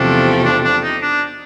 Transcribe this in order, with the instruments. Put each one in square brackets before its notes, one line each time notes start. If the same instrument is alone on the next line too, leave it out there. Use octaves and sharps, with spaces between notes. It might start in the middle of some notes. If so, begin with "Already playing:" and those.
Already playing: [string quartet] E2 C3 F3 A3 C4 [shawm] D4
[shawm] D4
D4
D#4
D4